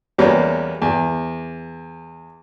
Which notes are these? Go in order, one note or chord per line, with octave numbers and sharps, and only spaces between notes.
E2 G3 A#3 B3 C#4
E2